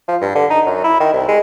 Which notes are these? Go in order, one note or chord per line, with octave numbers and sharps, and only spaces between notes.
F3
G2
D3
D#4
F#2
E4
D#3
C2
G#3